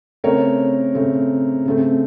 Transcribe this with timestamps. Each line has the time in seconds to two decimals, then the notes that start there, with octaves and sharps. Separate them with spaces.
0.24 C#3 A3 C4 A#4 C#5
0.95 C#3 A3 C4
1.65 C#3 A3 C4